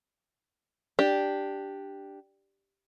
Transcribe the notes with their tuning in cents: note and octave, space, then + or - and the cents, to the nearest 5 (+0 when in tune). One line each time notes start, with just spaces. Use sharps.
D4 +0 G4 +0